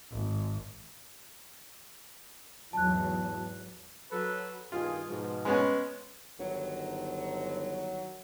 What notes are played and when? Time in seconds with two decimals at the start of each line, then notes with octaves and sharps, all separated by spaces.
0.11 G#1
2.73 E2 G#2 F#3 A5 F#6
4.12 F#3 A4 B4
4.72 G2 D#3 F4 G#4
5.09 G#2 B2 F3
5.45 G#3 B3 C#4
6.39 G1 D#3 F#3